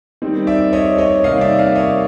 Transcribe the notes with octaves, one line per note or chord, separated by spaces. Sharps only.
D#3 G3 C4 D#4
D5 E5
C#5 D#5
C#5 D#5
C3 D#3 G3 A#3 D#4 D#5 F5
D5 E5
D#5 F5
C#5 D#5